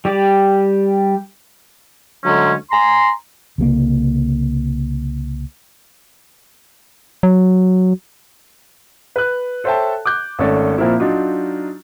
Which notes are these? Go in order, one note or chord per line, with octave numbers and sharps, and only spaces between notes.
G3 G4 D5
D2 D3 F#3 G#3 C#4
G#5 A#5 C6
C2 C#3 F3 A#3
F#3
B4 F#6
A4 C5 C#5 E5 G5 A5
D6 F#6 G6
G#1 A3 C#4 A4 D5
A#2 F3 A#3 C4 E4
F#3 D4 D#4 F4